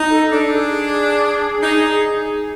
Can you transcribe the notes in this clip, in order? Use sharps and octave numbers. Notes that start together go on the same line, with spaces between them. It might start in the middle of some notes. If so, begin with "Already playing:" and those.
Already playing: D#4
A4
D4 A4
G#4
D#4